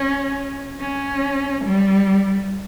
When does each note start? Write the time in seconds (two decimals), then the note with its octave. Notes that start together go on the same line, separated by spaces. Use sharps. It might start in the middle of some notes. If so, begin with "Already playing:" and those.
Already playing: C#4
0.80 C#4
1.65 G3